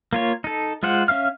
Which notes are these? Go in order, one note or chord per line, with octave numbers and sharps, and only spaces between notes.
A#3 F4 C#5
D#4 A4
G#3 F4 C5 F#5
C#4 E5 F5 F6